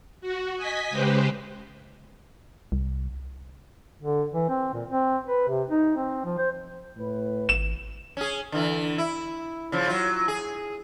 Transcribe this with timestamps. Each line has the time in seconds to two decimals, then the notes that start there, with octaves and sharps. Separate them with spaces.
0.21 F#4
0.57 D#5 G#5 B6
0.90 C#3 G#3 G4 B4 C5
2.72 C2
4.03 D3
4.34 E3
4.49 C4
4.74 A#2
4.90 C4
5.27 B4
5.48 C3
5.69 D#4
5.97 C4
6.25 F3
6.38 C5
6.97 A2 B4
7.49 G#1 E7
8.17 C#4 G#4
8.52 D3 E3
8.98 E4
9.72 C#3 F3
9.88 F#3 F4
10.28 G#4